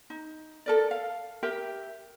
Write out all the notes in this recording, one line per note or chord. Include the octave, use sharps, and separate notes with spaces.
D#4
A4 A#4 D5
F5
G4 A#4 E5 G5